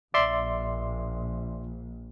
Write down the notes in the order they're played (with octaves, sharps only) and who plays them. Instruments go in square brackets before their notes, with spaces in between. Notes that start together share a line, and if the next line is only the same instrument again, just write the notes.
[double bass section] A#1 [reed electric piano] D5 E5 C6